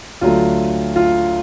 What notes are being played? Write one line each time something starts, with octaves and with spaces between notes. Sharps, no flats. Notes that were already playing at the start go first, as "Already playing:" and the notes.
D2 D3 F#3 A3 F4
F4